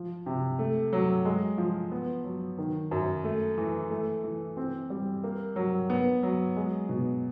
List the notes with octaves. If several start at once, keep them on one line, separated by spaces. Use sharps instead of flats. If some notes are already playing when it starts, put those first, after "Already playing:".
Already playing: F3
C3
A3
F#3
G#3
F3
B3
F#3
D#3
F#2
A3
E3
A3
E3
C4
G3
A#3
F#3
B3
F#3
G#3
B2